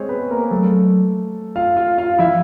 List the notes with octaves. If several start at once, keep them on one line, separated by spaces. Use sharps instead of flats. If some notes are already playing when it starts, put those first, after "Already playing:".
Already playing: G#3 C4 G#4 C5 C#5
B3 B4
A#3 A#4
F#3 A3 A4
F4 F5
F4 F5
F4 F5
F3 E4 E5